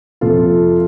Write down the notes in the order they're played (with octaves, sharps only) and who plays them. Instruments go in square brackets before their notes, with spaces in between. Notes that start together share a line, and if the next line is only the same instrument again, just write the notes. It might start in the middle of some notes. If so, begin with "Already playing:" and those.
[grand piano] F2 C3 F3 F4 A4